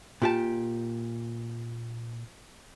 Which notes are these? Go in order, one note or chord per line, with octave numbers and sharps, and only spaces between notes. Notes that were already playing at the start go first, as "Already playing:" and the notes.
A#2 G4 A5